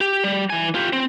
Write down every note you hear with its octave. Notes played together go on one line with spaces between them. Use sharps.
G4
G3
E3 G#5
F4 G4
C4